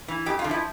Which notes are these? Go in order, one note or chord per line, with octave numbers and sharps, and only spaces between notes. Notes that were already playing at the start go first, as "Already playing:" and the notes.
E3
F2 G4
F4
D3
F3 E4